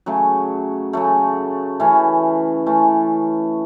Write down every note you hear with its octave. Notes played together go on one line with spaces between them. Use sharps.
C#3 F#3 A3
C#3 F#3 A3
E3 A3 C#4
E3 A3 C#4